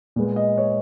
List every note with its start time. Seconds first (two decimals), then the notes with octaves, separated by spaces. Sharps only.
0.16 A#2 G#3 B3
0.36 D#5
0.58 C#5